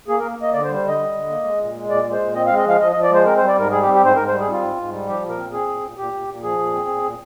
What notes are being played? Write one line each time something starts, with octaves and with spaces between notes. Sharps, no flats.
A#3 G#4
A#4
A#3
A#3 D#5
D3 D5
C5
G3
C5
D3 D#5
G3
D3
A#3
G#3
A#2
G#3
A#2 D5
G#3
C5
A#2
C4 D#5
F5
G#3
D#5
F3 F5
F3 D#5
D#5
F3
D5
G#3 C5
C4 A#4
C5
G3
D5
G#2 A#4
G3 G#4
G4
C4
G4
G#2 C5
G#2 A#4
C5
G3
G#4
C4 F4
G#2
G#2
G3
F3 G4
A#2
A#4
C4
C4 G#4
A#2
A#2
A#2 G4
A#2
A#2
F3 G#4
A#2
C4
A#2
A#2